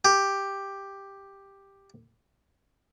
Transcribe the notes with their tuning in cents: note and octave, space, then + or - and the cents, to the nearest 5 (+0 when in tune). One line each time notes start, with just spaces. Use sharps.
G4 +5